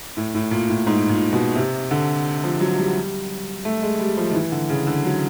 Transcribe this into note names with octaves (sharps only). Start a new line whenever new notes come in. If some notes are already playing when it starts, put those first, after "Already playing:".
A2
A2
A#2
A2
G#2
A#2
B2
C3
D3
F3
F#3
G3
A3
G#3
G3
F3
D#3
E3
D3
C#3
D3
F#3